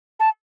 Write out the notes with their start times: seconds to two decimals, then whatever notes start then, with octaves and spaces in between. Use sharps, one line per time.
0.20 A5